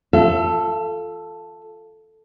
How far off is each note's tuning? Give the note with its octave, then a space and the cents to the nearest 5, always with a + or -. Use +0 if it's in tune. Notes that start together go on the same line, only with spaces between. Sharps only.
F4 +0 A4 +0 E5 +40